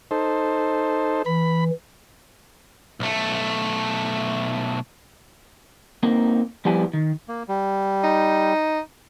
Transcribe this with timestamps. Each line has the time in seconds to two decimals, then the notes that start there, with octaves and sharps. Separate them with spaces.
0.11 D#4 A4 C5
1.26 E3 B5
3.00 B1 A3
6.03 A#3 C4 D#4
6.65 F3 G3 B3 E4 G#5
6.93 D#3
7.28 A#3
7.48 G3
8.04 D#4